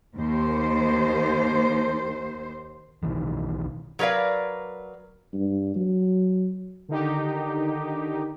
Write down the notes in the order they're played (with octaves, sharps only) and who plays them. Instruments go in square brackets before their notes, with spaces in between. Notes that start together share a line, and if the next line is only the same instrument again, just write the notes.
[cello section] D#2 C5
[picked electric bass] B1 D#3 E3
[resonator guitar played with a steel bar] F#3 A#4 B4 D5 F5
[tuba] G2
F#3
[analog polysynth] D3 D#3 D#4 G4